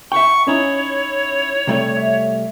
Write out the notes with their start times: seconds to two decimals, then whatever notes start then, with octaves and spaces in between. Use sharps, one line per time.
0.12 E5 F#5 G5 C#6
0.47 C#4 D#4 E4 C#5
1.67 C3 G3 A3
1.97 E5